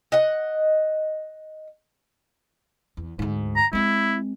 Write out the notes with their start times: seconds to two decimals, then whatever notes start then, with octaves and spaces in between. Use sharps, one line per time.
0.12 D#5 F#5
2.97 E2
3.19 D2 G#2
3.56 A#5
3.73 G#3 C4 E4